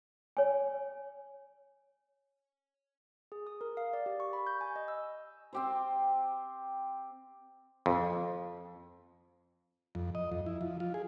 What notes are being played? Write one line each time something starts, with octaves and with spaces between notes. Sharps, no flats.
C#5 G#5
G#4
D#6
A#4
F5
D5
G4
C#6
B5
G6
G#5
D#5
E6
C4 G4 C5
F2
F2
D#5
F2
E4
F3
F4
G#4